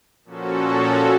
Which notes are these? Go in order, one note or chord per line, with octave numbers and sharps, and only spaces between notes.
A#2 F3 C#4 F#4 A4